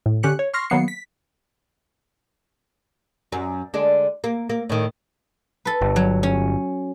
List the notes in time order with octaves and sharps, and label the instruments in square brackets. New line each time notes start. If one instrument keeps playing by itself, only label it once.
[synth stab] A2
D3 C#4 G4 F#6 C#7
C#5
C6 C#6 F6 A#6 C7
D#3 F#3 A#3 B3 C7 C#7
B6
[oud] F#2
D3 G#3 D4
A#3
A#3
A2 D#3
[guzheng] A4 B4
[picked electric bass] G1
[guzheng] F#3
C#4